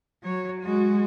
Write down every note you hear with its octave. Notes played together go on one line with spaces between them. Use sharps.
F#3 C#5
G#3 F#4